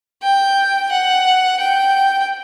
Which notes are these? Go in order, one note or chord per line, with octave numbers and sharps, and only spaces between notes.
G5
F#5
G5